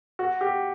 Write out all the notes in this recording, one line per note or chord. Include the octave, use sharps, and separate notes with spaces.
F#4
G4